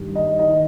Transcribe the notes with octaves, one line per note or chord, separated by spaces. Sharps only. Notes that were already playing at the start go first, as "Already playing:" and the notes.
Already playing: G2 D#3
D#5
D#3 D#5